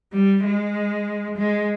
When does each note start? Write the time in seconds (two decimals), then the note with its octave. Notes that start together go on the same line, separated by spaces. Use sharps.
0.13 G3
0.45 G#3
1.37 G#3